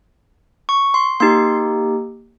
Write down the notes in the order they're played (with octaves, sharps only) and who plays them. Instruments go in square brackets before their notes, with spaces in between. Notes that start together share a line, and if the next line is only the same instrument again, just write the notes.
[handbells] C#6
C6
A#3 D#4 G4 C6